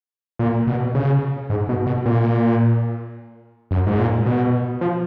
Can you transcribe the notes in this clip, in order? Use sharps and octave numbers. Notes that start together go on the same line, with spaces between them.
A#2
B2
C#3
G#2
B2
B2
A#2
F#2
G#2
A#2
B2
F3